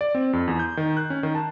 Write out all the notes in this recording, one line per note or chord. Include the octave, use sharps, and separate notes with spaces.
D5
C4
F2
E2
G6
D#3
F#6
C#4
D#3
A5